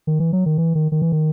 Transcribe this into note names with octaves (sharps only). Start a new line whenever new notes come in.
D#3
E3
F#3
D#3
E3
D#3
D#3
E3
D#3